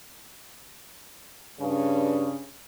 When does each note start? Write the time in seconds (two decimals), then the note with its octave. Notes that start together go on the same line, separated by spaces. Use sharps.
1.60 G2 C#3